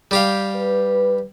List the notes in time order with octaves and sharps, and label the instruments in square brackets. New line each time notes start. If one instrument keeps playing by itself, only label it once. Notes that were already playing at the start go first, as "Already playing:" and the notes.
[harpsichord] G3 G4 F5
[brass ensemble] B4